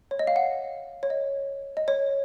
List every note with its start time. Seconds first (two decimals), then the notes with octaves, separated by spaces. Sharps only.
0.11 C#5
0.19 D#5
0.27 F5
0.36 F#5
1.03 C#5
1.10 D#5
1.77 D#5
1.88 C#5